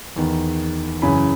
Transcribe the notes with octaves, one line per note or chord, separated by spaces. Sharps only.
E2 D#3
F#2 C#3 E3 G#5 B5